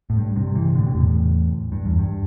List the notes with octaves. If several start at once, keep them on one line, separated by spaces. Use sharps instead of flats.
A2
G2
G2 C3
C3 E3
A2 D3
C3
E2 A2
G2
E2
G2